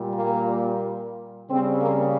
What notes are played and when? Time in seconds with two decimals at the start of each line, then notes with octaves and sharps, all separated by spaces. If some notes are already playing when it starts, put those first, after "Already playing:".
Already playing: A#2 G3
0.13 A#3
1.50 C#3 G3 C4
1.80 A#3